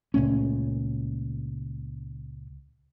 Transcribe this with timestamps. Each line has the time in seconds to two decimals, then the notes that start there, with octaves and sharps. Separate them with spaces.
0.14 C#2 A#2 A3 C#4